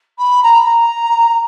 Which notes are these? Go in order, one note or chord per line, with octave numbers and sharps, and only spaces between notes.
B5
A#5
B5
A#5